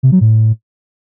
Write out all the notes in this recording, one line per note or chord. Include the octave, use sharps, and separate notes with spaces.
C3
F#3
A2